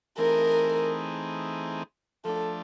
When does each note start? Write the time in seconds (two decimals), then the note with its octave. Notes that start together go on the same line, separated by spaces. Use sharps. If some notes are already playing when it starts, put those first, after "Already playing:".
0.18 E3 A3 C4 D#4 G#4 A#4
2.25 F3 A3 D4 A4